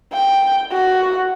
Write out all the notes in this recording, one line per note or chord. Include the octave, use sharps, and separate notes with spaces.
G5
F#4